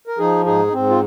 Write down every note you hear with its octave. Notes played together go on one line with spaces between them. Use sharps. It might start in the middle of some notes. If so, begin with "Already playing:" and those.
A#4
F3 D#4 G#4
G#2 D#4 G#4
D#4
G#2 C4
F4